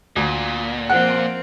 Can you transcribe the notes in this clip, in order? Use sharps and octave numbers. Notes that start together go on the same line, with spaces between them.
D2 A#2
F3 A#3 C4 F#5